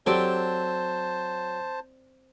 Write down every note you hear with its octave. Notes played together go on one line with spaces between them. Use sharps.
F#3 C4 G4 A4 C5 D5 A5